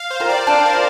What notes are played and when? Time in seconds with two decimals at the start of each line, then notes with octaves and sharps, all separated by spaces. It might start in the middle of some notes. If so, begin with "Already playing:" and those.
Already playing: F5
0.10 C5
0.20 F4 A#4
0.29 D5
0.47 D4 C5
0.65 A#4
0.73 F4